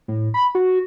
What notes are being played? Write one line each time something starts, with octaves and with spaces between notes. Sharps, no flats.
A2
B5
F#4